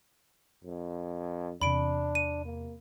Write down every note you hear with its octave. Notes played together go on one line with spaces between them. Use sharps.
F2
E2 C3 D4 B5 D7
D#7
A#3